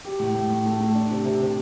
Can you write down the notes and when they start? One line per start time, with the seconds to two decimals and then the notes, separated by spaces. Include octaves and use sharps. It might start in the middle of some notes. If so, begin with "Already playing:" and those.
0.05 G4
0.20 A2
0.35 A2
0.50 A2
0.66 A3
0.80 A3
0.95 D4
1.11 C3
1.25 C3
1.42 C3